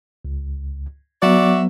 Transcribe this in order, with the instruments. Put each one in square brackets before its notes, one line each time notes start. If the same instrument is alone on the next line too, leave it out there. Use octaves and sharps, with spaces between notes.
[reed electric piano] C#2
[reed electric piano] F#3 B3 [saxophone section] F#4 D5 E5